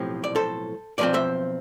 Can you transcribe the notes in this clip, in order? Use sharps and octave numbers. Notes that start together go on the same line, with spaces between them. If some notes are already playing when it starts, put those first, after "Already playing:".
Already playing: B1 A2 F3 C4 G4
D5
A4 C5
B1 A2 F3 C4 B4 D5
C5 E5